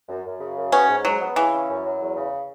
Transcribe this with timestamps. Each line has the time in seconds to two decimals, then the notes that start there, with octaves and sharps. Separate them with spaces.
0.08 F#2
0.25 F#2
0.40 C#3
0.56 F#2
0.72 B3 C#4
0.88 G#2
1.04 G#2 F#3
1.21 B3
1.36 C#3 E3
1.53 C#4
1.69 F#2
1.85 F#3
2.01 E2
2.16 C#3